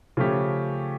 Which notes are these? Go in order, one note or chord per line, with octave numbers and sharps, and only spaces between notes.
C#3 F3 A3 C#4 G4